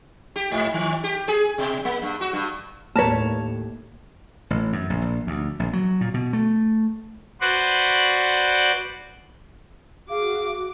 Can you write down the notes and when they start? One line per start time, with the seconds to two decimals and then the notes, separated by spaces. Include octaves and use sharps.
0.36 G4
0.51 G#2
0.74 D#3
1.04 G4
1.28 G#4
1.58 B2
1.85 A#3
2.02 G2
2.21 F#4
2.33 G2
2.96 D#2 A2 A#3 A#4 B4 C#5 A5
4.50 A1
4.73 F#2
4.90 A#1
5.02 A#1
5.27 D2
5.60 A#1
5.73 F#3
6.01 A#2
6.14 B2
6.33 A3
7.41 F#4 B4 C5 D5 F#5
10.10 F#4 G#4 F5 D6